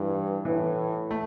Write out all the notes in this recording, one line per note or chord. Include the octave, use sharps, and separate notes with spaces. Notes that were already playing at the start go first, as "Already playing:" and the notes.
Already playing: G2 E3
A2 E3
A3